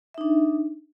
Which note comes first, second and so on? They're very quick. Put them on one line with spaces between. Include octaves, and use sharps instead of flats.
E5 D#4 D4